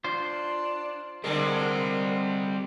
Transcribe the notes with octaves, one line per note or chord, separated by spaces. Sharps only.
D4 F4 C5
D3 G3 G#3 C4 A#4